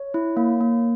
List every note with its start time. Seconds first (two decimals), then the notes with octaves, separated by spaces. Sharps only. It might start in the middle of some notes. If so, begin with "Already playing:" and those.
Already playing: C#5
0.14 E4
0.37 A#3
0.61 A#3